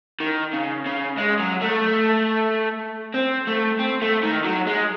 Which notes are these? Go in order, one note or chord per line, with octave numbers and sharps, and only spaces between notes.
D#3
C#3
C#3
G#3
F#3
A3
C4
A3
C4
A3
D#3
F#3
G#3